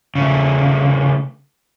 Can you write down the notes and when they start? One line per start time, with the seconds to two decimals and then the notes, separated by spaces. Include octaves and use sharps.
0.15 C#3 A3